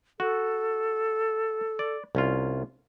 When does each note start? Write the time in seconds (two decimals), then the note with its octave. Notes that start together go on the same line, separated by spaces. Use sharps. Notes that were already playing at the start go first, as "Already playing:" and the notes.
0.20 F#4 A4
1.79 D5
2.15 C2 C#4 F4